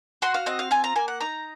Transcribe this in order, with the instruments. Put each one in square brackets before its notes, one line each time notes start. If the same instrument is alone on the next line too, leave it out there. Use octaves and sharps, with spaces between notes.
[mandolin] F#4 C6
F5
C4 D#5
F5
F4 G#5
A#5
A#3 G#5
F#5
D#4 A#5